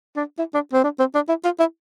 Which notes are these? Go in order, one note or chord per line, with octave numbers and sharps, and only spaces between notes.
D4
E4
D4
C4
D4
C4
D4
E4
F4
E4